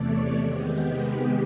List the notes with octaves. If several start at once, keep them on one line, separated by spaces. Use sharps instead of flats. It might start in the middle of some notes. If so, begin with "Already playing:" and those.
Already playing: E2 C3 E3 A3 C#5 D5
C3 D#3 G#3 B3 G4